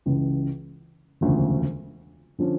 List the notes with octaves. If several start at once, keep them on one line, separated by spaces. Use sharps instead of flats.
C#2 C#3 E3
E1 D2 C#3 F3
D3 F3 C#4